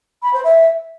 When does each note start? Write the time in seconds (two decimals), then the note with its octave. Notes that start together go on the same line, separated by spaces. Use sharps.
0.22 B5
0.33 C5
0.44 E5